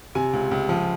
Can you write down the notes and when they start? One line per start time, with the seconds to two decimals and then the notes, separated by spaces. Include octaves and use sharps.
0.15 C3 G#5
0.33 C#2
0.51 C#2
0.69 F3